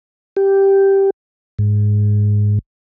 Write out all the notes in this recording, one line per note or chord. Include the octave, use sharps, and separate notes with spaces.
G4
G#2